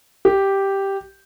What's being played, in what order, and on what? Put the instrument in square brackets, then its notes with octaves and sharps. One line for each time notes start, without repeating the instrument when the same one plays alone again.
[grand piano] G4